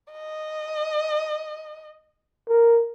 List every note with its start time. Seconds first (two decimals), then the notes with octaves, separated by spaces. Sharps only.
0.12 D#5
2.49 A#4